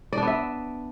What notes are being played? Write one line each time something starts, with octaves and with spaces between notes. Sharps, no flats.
B3 D4 D5 E5